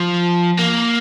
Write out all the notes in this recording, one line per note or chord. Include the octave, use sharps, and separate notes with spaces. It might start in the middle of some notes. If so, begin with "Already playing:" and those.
Already playing: F3
A#3